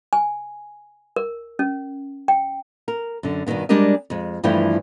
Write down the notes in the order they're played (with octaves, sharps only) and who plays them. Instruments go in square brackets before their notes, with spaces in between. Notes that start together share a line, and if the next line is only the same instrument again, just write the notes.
[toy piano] G#5
A#4
C#4
G5
[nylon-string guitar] A#4
F#2 D3
G2 B2 D3 D#3 B3
G3 G#3 D4 G4 A#4 D#5
F2 G#3
G2 E3 F3 A3 E4 G5